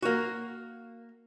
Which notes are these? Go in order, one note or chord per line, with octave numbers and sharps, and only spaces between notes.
A#3 F#4